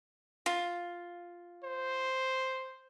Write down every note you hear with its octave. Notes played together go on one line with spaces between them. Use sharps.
F4
C5